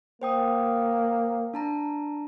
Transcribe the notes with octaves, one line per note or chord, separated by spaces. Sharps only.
A#3 C5 G5 D#6
D4 A5 A#5